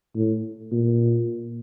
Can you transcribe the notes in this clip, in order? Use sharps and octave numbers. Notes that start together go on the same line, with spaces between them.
A2
A#2